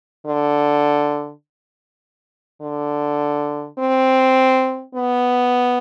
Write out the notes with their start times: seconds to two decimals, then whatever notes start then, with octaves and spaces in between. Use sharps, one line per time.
0.26 D3
2.61 D3
3.79 C4
4.95 B3